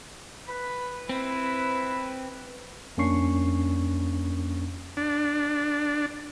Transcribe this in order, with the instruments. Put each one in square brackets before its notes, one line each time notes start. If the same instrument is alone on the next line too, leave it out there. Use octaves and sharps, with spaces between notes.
[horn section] B4 [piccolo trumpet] B5
[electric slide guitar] C4 [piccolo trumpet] E4
[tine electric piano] F2 A#3 C#4 D4 C#6 C7
[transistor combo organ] D4